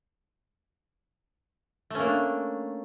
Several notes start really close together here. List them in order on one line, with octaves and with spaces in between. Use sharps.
A3 C#4 A#3 D4